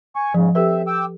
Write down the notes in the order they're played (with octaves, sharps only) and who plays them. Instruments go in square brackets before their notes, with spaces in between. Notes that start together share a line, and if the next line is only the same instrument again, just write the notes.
[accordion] G#5 C#6
[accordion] G#2 C#3 [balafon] F3
[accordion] C4 E5 [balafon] G4 A4 B4
[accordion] G5 D6 E6